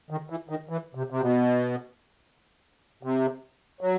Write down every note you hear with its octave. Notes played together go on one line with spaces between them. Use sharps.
D#3
E3
D#3
E3
C3
C3
B2
C3
F#3